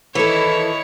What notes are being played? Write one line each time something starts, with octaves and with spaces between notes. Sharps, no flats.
D#3 E3 E4 A4 C#5